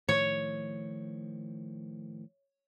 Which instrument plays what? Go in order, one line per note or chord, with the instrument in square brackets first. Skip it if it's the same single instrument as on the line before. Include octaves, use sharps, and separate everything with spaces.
[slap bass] A2 D#3 F3 [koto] C#5